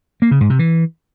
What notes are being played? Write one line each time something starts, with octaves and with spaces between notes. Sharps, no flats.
A#3
C#3
G#2
C3
E3